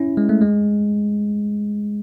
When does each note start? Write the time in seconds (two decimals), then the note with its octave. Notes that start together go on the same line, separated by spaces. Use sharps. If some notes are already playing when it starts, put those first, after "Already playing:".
Already playing: C#4 E4
0.17 G#3
0.29 A3
0.42 G#3